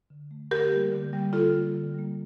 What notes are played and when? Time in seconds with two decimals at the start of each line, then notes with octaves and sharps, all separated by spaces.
0.10 D3
0.31 A3
0.51 D3 G4 A#4
0.72 G3 A#3
0.92 D3
1.13 G3 A#3
1.33 D3 F4 A4
1.54 G3 A#3
1.74 D3
1.94 G3 A#3